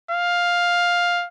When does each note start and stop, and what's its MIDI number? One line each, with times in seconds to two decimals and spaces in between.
0.11 1.27 77